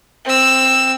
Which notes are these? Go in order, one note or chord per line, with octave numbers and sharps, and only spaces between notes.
C4 E6